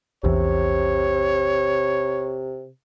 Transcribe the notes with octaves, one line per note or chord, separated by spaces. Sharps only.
A#1 E2 C3 E3 C#5